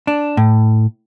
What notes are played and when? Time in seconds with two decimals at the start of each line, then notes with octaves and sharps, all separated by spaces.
0.07 D4
0.37 A2